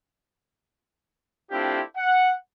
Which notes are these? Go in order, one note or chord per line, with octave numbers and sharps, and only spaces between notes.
A3 C4 D4 E4 F4 G4
F#5